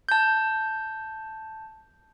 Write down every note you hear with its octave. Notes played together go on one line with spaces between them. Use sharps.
A5 G6